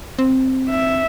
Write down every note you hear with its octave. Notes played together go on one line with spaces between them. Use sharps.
C4
E5